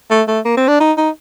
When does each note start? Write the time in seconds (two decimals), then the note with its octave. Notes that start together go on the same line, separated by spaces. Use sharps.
0.10 A3
0.28 A3
0.45 A#3
0.57 C4
0.68 D4
0.80 D#4
0.98 D#4